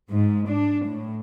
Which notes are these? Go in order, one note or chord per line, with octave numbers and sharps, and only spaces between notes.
G#2
D4
A2